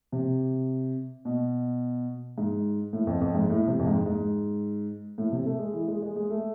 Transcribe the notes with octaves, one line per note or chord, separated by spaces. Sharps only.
C3
B2
G#2
A2
F2
F2
G#2
A2
C3
F2
G#2
G#2
A2
C3
A3
G#3
E3
G#3
G#3
G#3
A3